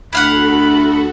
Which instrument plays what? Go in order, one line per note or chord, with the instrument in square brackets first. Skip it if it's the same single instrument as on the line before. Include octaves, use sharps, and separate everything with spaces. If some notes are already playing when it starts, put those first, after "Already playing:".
[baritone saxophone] D2 [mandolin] E4 F5 F#5 [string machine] F#4 A4 [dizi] B5